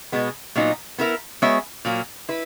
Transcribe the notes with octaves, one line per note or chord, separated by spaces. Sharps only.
B2 G#3 B3
A#2 F#3 B3 D#4
B3 E4 A#4 E5
G#3 B3 F#4 C#5 E5
A#2 F#3 A#3
E4 B4